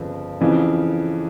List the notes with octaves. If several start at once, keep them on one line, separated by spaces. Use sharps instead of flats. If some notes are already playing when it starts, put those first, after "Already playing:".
Already playing: G1 F2 C#3
F2 C#3 E3